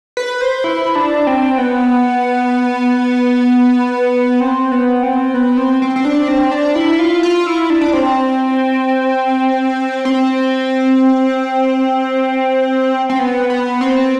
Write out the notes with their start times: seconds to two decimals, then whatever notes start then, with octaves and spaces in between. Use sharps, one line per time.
0.17 B4
0.41 C5
0.64 E4
0.95 D4
1.27 C4
1.58 B3
4.40 C4
4.72 B3
5.03 C4
5.34 B3
5.57 C4
5.82 C4
5.96 C4
6.05 D4
6.28 C4
6.51 D4
6.75 E4
6.99 F4
7.23 F4
7.47 E4
7.70 D4
7.81 D4
7.93 C4
10.05 C4
13.09 C4
13.19 B3
13.50 B3
13.81 C4